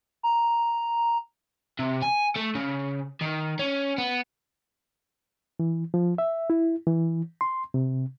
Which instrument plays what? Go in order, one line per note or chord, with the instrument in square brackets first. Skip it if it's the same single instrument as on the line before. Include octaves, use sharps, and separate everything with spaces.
[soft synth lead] A#5
[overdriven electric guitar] C3
G#5
A3
C#3
D#3
C#4
B3
[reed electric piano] E3
F3
E5
E4
E3
C6
C3